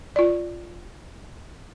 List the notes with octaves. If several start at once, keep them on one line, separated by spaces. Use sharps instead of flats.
F4 D5